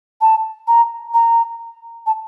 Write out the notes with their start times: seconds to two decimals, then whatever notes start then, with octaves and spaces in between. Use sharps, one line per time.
0.21 A5
0.68 A#5
1.14 A#5
2.06 A5